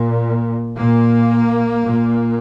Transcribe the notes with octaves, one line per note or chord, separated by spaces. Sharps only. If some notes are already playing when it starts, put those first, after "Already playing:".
Already playing: A#2
A#2 A#3
A#2